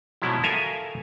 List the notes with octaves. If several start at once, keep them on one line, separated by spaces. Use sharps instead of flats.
B2 F3 F#3 G#3 E4
A4 A#4 E5 F5 G#5